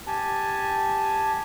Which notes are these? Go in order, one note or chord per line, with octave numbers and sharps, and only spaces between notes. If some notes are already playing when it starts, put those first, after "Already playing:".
G4 G#5 A5